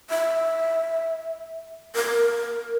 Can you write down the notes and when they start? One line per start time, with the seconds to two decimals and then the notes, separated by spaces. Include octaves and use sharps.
0.10 E5
1.95 A#4